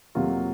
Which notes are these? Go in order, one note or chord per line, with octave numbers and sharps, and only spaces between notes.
F2 C3 F#3 A#3 F4